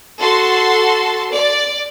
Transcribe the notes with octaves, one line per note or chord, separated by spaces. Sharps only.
F#4 A4 C6
D5